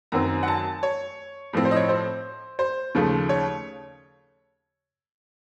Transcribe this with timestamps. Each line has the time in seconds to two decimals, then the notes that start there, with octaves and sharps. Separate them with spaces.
0.12 F#2 D#3 F#3 C4 A#5
0.43 F#5
0.48 A5
0.83 C#5
1.53 A2 F3 C4
1.65 C5
1.71 D#5
1.76 C#5
1.89 C5
2.59 C5
2.95 D#2 C#3 F3 A3
3.29 C#5